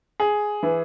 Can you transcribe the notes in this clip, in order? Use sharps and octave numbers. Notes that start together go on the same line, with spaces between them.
G#4
E3